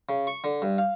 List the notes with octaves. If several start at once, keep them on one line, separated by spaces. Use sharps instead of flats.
C#3
C#6
D3
G2
F5